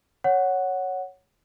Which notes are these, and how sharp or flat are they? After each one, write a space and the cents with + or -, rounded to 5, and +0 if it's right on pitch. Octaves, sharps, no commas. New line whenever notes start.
C#5 +0 F#5 +0